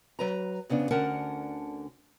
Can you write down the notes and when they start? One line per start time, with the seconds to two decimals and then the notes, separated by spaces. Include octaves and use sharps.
0.19 F#3 B4 A#5
0.69 F2 C#3 B3 D4
0.90 D2 D3 C#4 A#4 F#5 A5